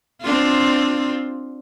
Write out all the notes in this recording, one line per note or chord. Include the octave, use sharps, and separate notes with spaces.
C4 D4 F4